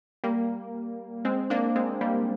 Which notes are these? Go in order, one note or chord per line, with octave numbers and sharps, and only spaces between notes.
G3 A#3
G#3 C4
A#3 D4
G#3 C4
G3 A#3